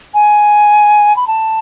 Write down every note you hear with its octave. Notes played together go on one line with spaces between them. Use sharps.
G#5
B5
A5